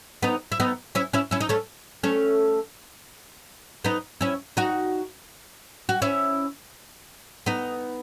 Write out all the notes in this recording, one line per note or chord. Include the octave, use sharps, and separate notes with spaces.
B3 D#4
E4
B3 D#4
C#4 E4
C#4 E4
C#4 E4
D#4
A3 C#4
A3 C#4
B3 D#4
C#4 E4
D#4 F#4
F#4
C#4 E4
B3 D#4